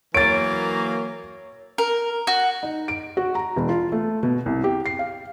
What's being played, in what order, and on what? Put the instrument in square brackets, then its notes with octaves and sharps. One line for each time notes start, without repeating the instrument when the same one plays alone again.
[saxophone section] E3 F#3 A#3 [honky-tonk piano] C#5 [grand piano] A6 D7
[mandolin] A#4
F#4
[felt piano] D#4
D7
F#4
A#5
E1
F4
A3
B2
C2
G4
C7
F5